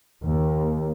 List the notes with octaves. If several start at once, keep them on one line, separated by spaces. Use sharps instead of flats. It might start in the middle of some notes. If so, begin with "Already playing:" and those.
D#2